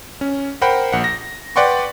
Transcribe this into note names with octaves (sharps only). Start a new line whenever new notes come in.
C#4
A#4 C5 F#5 G5 B5
A#1 F#5
A#6
B4 D5 F#5 G5 C6 C#6